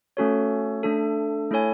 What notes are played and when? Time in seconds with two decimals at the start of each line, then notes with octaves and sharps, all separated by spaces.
0.17 A3 C#4 F#4 A4 C#5
0.83 A3 D4 A4
1.51 A3 E4 A4 C#5 G#5